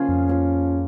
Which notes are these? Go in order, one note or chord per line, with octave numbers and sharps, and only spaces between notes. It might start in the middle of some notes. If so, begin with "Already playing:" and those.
Already playing: C#3 F3 A#3 C#4 F4 G#4
F2
A#3 C#4 F4